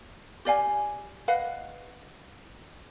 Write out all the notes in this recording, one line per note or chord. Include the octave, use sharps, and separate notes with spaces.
G4 D5 F5 G#5
B4 D#5 F5 F#5